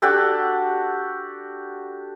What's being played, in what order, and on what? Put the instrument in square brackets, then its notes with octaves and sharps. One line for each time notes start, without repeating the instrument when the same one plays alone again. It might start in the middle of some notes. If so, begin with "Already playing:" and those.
[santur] D4 F#4 G4 A4